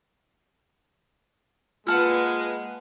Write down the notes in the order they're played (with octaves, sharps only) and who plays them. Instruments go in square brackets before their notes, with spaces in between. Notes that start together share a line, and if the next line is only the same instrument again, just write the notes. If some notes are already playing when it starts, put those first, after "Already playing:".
[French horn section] G#3 [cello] A#3 B4 [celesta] F4 F6 [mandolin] F#5 A5 E6